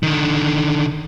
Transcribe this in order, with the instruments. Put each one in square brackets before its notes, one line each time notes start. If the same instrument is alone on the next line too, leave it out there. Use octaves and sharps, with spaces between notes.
[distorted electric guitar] D3 D#3